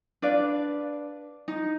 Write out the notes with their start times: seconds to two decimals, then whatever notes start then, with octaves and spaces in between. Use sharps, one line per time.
0.22 D4 B4 D5 F5
1.48 D#4